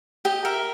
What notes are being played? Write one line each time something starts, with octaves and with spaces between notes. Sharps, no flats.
G4 D#5
A#4 E5